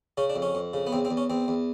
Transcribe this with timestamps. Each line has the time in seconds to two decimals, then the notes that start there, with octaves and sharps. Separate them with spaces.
0.17 C#3 C#4
0.30 D4
0.36 F2
0.42 C#4
0.55 F2
0.74 C#3
0.87 B3
0.92 E2 C4
1.05 C4
1.11 E2
1.17 C#4
1.30 E2 C4
1.48 E2